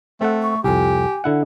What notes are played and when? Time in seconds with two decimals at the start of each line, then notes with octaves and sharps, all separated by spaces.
0.21 A3 C4 A4 F#5
0.42 C#6
0.64 C2 F2 G4 G#5
1.24 D3 E4 F#5